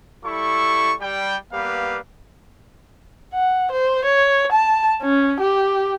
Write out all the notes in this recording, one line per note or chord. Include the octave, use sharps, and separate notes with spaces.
G3 E4 A4 C#6
G3 G5
G3 A#3 B3 G4 B4 F5
F#5
C5
C#5
A5
C#4
G4